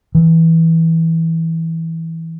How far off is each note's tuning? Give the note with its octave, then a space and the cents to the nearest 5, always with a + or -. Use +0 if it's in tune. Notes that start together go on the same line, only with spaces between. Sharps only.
E3 -15